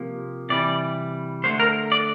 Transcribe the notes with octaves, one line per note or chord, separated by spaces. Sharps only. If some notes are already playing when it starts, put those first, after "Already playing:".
Already playing: C3 F3 A#3
C3 E3 G3 D5
D3 A3 C5
A#4
D5